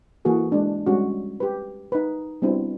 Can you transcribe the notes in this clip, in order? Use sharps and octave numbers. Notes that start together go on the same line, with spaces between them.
E3 A#3 F#4 G#4 A4
G#3 D4
G3 G#3 C#4 F#4
G4 B4
D#4 B4
G3 B3 C4 D4 E4 F#4